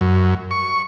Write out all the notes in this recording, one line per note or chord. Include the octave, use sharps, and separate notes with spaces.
F#2
C#6